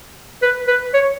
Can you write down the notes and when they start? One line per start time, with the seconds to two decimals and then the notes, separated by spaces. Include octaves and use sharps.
0.42 B4
0.68 B4
0.94 C#5